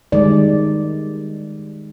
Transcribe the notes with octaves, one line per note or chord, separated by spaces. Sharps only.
D#3 G3 G#3 D#4 G4 D5